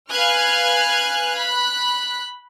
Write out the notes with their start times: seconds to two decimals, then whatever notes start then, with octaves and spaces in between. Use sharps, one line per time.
0.11 B4 F5 G#5 F6 F#6 G#6
1.38 B5 F#6